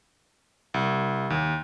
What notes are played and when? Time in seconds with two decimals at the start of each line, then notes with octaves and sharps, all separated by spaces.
0.74 C2
1.30 D#2